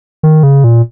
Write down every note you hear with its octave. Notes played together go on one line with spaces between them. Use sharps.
D#3
C#3
A#2